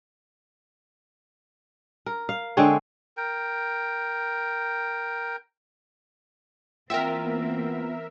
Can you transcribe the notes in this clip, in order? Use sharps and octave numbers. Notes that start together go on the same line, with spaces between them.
A#4
F5
D3 G#3 C4 C#5
A#4 G5
E3 A#3 C4 F4 A#4 E5 F#5 G5
B3